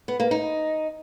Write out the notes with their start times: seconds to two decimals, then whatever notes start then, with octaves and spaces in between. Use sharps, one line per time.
0.08 B3
0.20 A#3
0.31 D#4